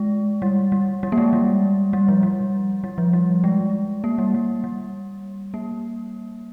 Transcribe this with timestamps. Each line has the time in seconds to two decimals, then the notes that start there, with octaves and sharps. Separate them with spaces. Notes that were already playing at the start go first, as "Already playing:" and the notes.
Already playing: G#3
0.42 G3
0.72 G3
1.03 G3
1.12 A#3
1.18 G#3
1.33 G3
1.93 G3
2.08 F3
2.23 G3
2.84 G3
2.98 F3
3.13 G3
3.44 G#3
4.04 A#3
4.18 G3
4.34 G3
4.64 G3
5.54 A#3